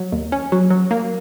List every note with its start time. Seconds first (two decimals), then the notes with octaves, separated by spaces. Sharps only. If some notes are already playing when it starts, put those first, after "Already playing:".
Already playing: F#3
0.12 D#2
0.32 C#4
0.52 F#3
0.70 F#3
0.91 A#3